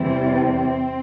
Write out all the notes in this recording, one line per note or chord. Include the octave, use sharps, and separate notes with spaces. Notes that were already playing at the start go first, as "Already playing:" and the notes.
Already playing: E2 C3 E3 G3 C4
C4